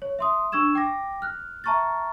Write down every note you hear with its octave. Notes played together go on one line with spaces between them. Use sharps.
C#5
E5 C6 D#6
D4 C#6 E6 G#6 E7
G5 D6 A#6
F6 F#6
E5 A5 A#5 C#6 F6 A6